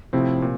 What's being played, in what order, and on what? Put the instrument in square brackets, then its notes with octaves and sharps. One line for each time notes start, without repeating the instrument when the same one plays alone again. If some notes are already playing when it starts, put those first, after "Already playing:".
[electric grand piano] A2 F3 C4 E4 [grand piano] C3
[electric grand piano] A#2